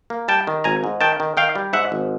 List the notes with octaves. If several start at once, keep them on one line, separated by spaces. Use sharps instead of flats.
A#3
G3 G5 A5
D#3
G#1 G#5 A#5
G#2
D#3 G5 A5
D#3
D#3 F5 G5
G3
G#2 E5 F#5
G#1